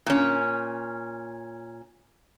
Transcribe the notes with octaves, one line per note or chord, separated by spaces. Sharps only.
A#2 C#4